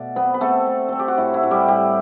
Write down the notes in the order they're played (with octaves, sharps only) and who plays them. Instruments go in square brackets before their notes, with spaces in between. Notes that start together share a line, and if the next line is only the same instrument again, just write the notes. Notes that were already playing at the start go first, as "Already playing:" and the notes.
Already playing: [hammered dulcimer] B2 A3 D5
B3 C4 B4
B4
A3 C4 A4
A3
C4 A4
G4
F#4
A2 E4
E4
A2
G3 G4
A2 G3 G4